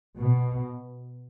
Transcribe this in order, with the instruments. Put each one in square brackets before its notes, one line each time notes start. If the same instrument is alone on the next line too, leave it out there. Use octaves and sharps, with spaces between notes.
[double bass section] B2